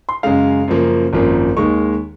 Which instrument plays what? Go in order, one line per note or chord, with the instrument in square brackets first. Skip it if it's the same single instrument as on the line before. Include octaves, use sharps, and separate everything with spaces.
[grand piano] C6
F#2 C#3 G#3 F5
F#2 C#3 F3 A#3
G#1 F#2 F3 A#3
D#2 D#3 G#3 C#6